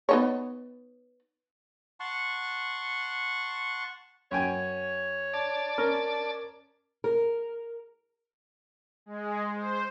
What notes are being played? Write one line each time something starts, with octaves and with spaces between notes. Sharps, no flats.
B3 D#4 C#5
F#5 A5 C6 C#6
F#2 C#5 G5 G#5
D5 A5
C#4 A#4
A#4
G#3
C5